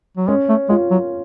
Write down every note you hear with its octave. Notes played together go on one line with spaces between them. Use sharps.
F#3
G#3 C#4
A3
G#3 F4
F#3